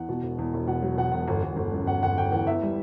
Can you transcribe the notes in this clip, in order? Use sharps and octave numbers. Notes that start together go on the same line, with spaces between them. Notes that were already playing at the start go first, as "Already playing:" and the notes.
Already playing: E2 F#5
B2
E1
E2
E1
B2 F#5
F#3
B2 F#5
E1 F#5
G1
G1
G1
F#2
G1 F#5
G1 F#5
G1 G5
E3 F#5
E2 E5
G3